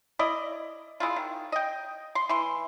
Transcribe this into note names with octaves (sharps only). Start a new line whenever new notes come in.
E4 D5 D#5
G#3 E4 F4
D#3
D#5 G5
C6
E3 C6